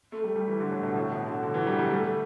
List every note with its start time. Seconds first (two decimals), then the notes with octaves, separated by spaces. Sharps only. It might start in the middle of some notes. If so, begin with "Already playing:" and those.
0.12 A3
0.24 G3
0.35 G3
0.48 E3
0.60 D3
0.71 A2
0.83 B2
0.95 A2
1.12 B2
1.26 D3
1.43 D3
1.54 E3
1.67 G3
1.79 G3
1.90 A3